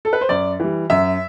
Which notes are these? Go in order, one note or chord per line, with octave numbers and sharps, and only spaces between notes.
A4
B4
C5
F#2 D5
E3 G3
F#2 E5